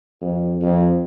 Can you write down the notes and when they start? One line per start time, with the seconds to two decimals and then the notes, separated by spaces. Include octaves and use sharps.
0.22 F2
0.61 F2